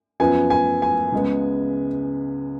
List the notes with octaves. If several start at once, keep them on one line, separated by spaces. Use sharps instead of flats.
F#2 F3 B3 G#5
G#5
G#5
C#2 C#3 G#3 B3